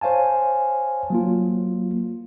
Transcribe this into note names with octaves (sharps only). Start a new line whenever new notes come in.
C5 C#5 F5 G#5 A5
F#3 A#3 F4